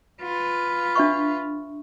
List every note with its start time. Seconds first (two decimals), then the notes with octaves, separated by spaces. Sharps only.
0.22 F4 B4
0.96 D4 E5 C#6